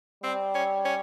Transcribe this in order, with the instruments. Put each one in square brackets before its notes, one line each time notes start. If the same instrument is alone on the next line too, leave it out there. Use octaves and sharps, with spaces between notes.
[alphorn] G3 [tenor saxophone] C4
[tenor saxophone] C#4
C#4